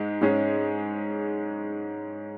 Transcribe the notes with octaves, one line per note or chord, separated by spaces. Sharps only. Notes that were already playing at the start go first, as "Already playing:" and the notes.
Already playing: G#2 G#3
G#2 G#3 C#4 G#4